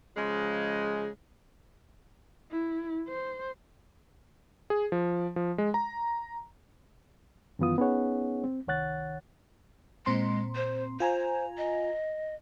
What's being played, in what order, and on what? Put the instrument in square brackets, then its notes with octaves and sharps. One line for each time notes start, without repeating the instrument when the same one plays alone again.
[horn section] C#3 F3 G#3
[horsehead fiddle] E4
C5
[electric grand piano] G#4
F3
F3
G#3
A#5
[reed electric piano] F#2 D#3 E3 B3 F4 D#6
B3 C#4 D#4 G#4 C#5 F#5
C4
C2 D#3 C#5 F#5 F#6 A6
[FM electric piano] A#2 C4 C6 [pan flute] G#3
[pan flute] C5
[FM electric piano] F4 G#5 A#5 [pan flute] C5
[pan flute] D#5